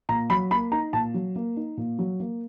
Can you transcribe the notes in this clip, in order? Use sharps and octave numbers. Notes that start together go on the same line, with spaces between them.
A#2 A#5
F#3 B5
A#3 B5
D#4 A#5
A#2 A5
F#3
A#3
D#4
A#2
F#3
A#3